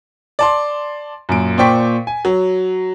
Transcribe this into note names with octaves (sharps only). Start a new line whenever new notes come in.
D5 A5 C6
F#2 A#2 D7
A#2 C5 D5 G5 C#6 B6
G#5
F#3